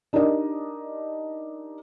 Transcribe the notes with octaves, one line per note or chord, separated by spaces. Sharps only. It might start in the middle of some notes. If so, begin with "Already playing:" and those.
D4 D#4 G4 A#4 D5 D#5